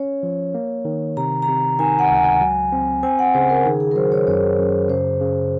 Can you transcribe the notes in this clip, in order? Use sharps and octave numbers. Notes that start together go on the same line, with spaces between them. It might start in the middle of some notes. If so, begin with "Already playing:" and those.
Already playing: C#4 C#5
F3
A#3
D#3
C3 A#5
A#5
C3
D#3 G#5
F#5
C#2
G#5
F#3
C4
C4 G#5
F#5
C#3 C5
A#4
D#3 G#4
G#4
A#4
F#3 C5
C#5
F#2 C#5
F#2
C#3 C5
C#3